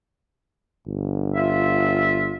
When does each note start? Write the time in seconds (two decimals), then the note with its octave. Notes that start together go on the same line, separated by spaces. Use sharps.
0.87 G1
1.35 F4 E5